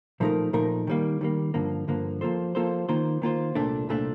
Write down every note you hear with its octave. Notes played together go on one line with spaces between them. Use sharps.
A#2 F3 A3 D#4 A#4
A#2 F3 A3 D#4 A#4
D#3 G3 A#3
D#3 G3 A#3
G2 D3 F3 A#3
G2 D3 F3 A#3
F3 A#3 F4 A4 C5
F3 A#3 F4 A4 C5
D#3 A#3 F4 C5
D#3 A#3 F4 C5
C2 A#2 A3 D4
C2 A#2 A3 D4